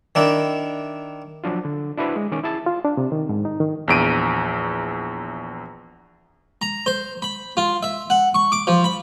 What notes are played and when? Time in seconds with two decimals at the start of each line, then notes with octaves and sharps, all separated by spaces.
0.15 D#3 D4 E4
1.44 F3 F#3 D4 F4
1.65 D3
1.98 D4 E4 F#4 B4 C5 D5
2.16 G#3
2.32 D#3 C#4 D6
2.43 E4 G#4 A5
2.66 F4
2.85 D4
2.97 C3
3.12 D#3
3.29 G#2
3.45 D#4
3.60 D#3
3.88 A#1 E2 D7 D#7
6.62 A#5
6.86 C5
7.22 B5
7.57 F4
7.83 E5
8.10 F#5
8.35 C#6
8.52 D6
8.67 F3
8.84 B5